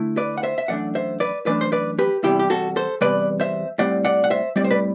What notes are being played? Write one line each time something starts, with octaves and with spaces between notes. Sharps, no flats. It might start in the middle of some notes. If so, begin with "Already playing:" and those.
Already playing: D3 A3 E4
B4 D5
F#5
C5 E5
E5
F#2 E3 A3 D4 D5 F#5
C5 E5
B4 D5
F#2 E3 A3 D4 B4 D5
C5
B4 D5
G4 B4
E2 C3 G3 E4 G4
G4
F#4 A4
A4 C5
E2 C3 G3 B4 D5
C5 E5
A2 G3 C4 D5 F#5
D5 F#5
F#5
C5 E5
A2 G3 C4 D5
C5
B4 D5